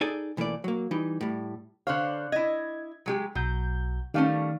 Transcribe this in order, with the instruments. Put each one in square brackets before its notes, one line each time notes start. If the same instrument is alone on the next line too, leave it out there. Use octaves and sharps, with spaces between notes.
[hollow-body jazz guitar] D#4 G#4 A4 D5 G#5
B1 E3 A3 A#3 D5
F#3 A#3
E3 G3 D#4
A2 G3
[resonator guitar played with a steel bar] D3 C5 C#5 [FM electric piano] F5 F#6
[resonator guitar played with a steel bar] E4 D#5 [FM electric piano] G#6
[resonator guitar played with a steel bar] F#3 G#3 G4
[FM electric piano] B1 G6 [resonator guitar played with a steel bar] F#3
[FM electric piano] D#3 F5 [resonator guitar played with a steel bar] G3 A3 C#4